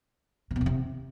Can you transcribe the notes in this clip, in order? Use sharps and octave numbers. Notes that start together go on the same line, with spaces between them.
C3
B2
E2
C3